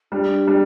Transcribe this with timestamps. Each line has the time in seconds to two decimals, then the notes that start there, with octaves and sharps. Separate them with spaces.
0.12 G3 D4
0.47 G3